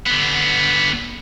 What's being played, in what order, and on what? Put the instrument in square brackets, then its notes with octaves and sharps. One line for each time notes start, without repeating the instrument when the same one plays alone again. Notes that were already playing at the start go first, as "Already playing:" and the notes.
[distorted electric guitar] D3 B3